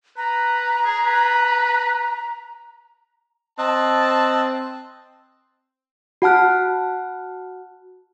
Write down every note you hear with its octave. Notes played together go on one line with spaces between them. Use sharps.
B4 A#5
G#4
B4
C4 D#5 A5 E6 F#6
F#4 F#5 A5 F6 F#6